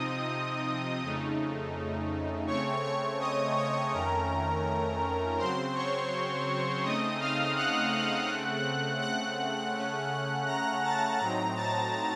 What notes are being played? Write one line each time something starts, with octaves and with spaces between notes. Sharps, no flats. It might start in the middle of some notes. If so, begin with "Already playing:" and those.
Already playing: C3 F3 C4 D#4 D#5 D#6
F2 C#3 A3 D#4
C#3 A3 C4 C#5 C#6
C#5 C#6
D#5 D#6
C#5 C#6
F2 D#3 A3 C#4 A#4 A#5
C#3 F#3 C4 C5 C6
C#5 C#6
C#3 A3 C4 D#4 D#5 D#6
F5 F6
F#5 F#6
C#3 A3 C4
F#5 F#6
C#3 A3 C#4
A#5 A#6
A5 A6
A2 F#3 C4 D#4 A#5 A#6
A5 A6